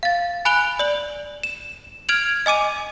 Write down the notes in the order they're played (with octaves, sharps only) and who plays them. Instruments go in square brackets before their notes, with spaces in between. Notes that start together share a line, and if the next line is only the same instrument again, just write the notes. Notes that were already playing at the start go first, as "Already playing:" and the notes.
[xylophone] F5 A6
G#5 B5 F#6 D7 F7 G7
D5 F#7
E7
F6 G#6 D7 F7 F#7
D#5 G#5 D6 D#7